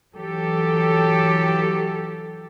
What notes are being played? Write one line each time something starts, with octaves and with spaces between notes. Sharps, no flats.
E3 F#3 G4 A4